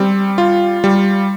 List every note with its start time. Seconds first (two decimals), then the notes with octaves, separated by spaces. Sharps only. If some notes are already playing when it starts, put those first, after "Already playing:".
Already playing: G3 C4
0.38 F4
0.84 G3